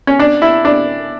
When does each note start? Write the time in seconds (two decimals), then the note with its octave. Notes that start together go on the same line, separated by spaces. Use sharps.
0.07 C#4
0.19 D4
0.42 E4
0.65 D4